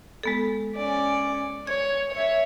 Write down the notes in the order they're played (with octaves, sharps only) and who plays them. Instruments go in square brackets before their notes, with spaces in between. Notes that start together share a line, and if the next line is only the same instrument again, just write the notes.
[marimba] G#3 B3 A4
[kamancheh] C#4 D5
[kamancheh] C#5 [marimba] G#6
[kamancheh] C#5 E5